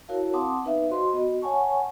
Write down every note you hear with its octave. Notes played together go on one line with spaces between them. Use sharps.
E4 F#4 A#4 C#5 F5 A5
C4 F#5 A5 C6 D6 D#6
B3 D#4 B4 E5 F5
F#4 C5 D#5 C6
B3 F#4 D#5
C#5 F#5 G#5 A5 C#6